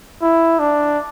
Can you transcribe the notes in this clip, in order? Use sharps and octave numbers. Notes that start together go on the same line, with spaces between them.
E4
D4